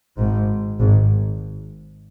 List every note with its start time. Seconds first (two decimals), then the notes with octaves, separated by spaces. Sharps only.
0.18 G#1 G#2
0.80 G#1 G#2